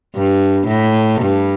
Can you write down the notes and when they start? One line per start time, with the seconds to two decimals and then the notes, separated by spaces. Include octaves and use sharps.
0.16 G2
0.67 A2
1.21 G2